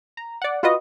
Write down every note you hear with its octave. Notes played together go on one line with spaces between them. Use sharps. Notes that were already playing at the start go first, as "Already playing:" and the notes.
A#5
D5 F#5
F4 F#4 B4 D#5